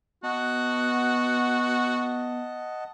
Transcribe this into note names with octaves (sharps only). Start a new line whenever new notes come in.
B3 F#4 D#5 F#5 A5